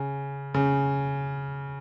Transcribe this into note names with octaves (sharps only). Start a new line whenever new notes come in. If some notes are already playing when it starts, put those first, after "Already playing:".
Already playing: C#3
C#3